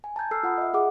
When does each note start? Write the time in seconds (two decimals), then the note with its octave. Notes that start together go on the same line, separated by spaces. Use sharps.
0.04 G#5
0.16 A5 A#5 G6 G#6
0.31 A4 E6 F6 C7
0.43 F4 F#5 B5 D#6
0.58 D#5 E5
0.73 F#4 G#4 F#5 D6